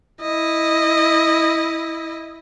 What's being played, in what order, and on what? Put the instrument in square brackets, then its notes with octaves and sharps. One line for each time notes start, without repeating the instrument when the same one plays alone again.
[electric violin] E4 D#5